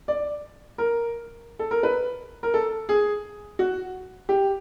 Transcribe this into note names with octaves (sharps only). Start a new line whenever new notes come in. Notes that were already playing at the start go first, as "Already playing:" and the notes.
D5
A#4
A4
A#4
B4
A#4
A4
G#4
F#4
G4